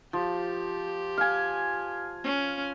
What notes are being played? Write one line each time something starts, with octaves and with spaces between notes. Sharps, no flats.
F3 G4
F5 G#5
C#4